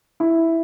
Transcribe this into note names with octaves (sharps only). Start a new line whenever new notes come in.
E4